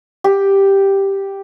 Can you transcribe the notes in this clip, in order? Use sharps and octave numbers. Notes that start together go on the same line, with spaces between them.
G4